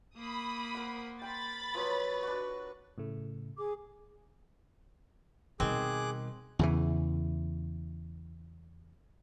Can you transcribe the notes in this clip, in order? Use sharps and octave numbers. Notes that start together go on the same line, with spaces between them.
A#3 B5 D#6
A#4 C5 F#5
G5 B5 C6 A6
F3 F#3 B4 C#5
D4 F#4
A2 C#3 A3
G#4 D6
B2 D#3 G3 C4 G#4 D6 F#6
E2 C#3 E3